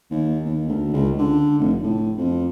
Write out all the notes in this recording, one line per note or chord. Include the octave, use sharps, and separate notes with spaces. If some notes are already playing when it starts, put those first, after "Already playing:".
D#2
D#2
D2
C#2
D3
F1
A2
F2